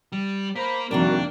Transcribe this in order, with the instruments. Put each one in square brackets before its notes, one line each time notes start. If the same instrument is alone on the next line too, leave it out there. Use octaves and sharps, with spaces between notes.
[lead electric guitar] G3
[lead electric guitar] A#3 [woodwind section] C5 B5
[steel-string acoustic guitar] F2 C3 D#3 [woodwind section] G3 F#4 [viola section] A#3 [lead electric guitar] D4